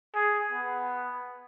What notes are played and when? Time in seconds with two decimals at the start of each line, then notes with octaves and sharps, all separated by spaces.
0.15 G#4
0.52 B3